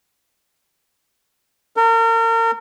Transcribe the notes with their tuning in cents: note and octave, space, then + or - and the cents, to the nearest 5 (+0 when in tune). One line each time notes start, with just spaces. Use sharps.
A#4 -35